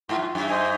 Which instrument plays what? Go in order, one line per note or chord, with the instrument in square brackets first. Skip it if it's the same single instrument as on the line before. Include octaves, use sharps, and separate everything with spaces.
[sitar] G#2 [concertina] F4
[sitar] F#2
F#2
[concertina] C5 D#5 G#5